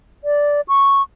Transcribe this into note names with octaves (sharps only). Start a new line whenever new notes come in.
D5
C#6